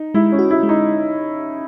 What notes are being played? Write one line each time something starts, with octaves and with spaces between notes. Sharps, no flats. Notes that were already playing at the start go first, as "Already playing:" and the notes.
Already playing: D#4
G#3 E4
C#4
F#4
E4
G#3
D#4